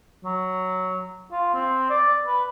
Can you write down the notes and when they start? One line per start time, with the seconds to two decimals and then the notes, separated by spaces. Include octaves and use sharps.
0.25 F#3
1.32 F4
1.54 C4
1.90 D5
2.27 B4